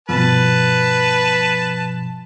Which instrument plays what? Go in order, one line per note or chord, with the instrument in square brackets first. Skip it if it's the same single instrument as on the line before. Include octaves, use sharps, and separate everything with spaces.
[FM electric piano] G2 B2 F3 [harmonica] B4 A5